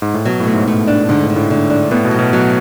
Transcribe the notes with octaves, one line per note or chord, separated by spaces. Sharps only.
G#2
A2
B2 F#3
A2
A3
G#2
A2 A3
D4
G#2 D3
A2
D3
A2
A2 D3
D4
A2 B3
B2
F#3
B2
F#3